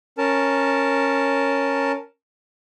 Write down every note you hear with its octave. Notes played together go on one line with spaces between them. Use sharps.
C#4 A#4 A5